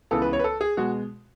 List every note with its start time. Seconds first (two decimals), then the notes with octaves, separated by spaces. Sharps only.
0.11 C#2 C#3 E3 B3 A4
0.22 B4
0.33 C#5
0.39 B4
0.44 A4
0.61 G#4
0.77 B2 G#3 F#4